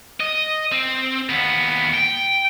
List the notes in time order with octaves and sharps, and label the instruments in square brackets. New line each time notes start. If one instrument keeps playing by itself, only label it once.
[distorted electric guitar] D#5
C4
D#2 B3
G5